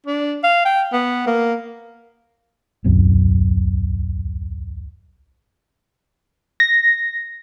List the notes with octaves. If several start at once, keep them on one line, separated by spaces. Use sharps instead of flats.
D4
F5
G5
B3
A#3
D1 B1 F#2 C4
A#6